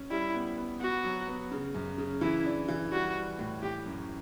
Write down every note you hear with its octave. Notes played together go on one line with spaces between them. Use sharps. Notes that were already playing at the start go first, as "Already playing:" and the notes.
Already playing: C#4
G3 E4
B3
B3
B3 F#4
F#3
B3
C#3
F#2
C#3
E3 E4
D4
E3
G3 F#4
G3
A2
E3 G4
F#2